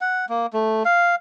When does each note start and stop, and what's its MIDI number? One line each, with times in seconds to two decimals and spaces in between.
0.01 0.25 78
0.29 0.46 58
0.53 0.83 57
0.85 1.15 77